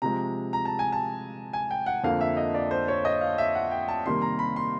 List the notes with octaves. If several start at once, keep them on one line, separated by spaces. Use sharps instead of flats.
C3 F3 G#3 A#5
A#5
A5
G#5
A5
G#5
G5
F#5
F2 D3 F3 A#3 F5
E5
D#5
D5
C5
C#5
D#5
F5
E5
F#5
G5
A5
C3 D#3 G3 A#3 C6
A#5
B5
C6